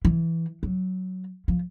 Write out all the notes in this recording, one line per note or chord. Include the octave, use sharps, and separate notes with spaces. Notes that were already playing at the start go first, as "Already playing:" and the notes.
E3
F#3
F3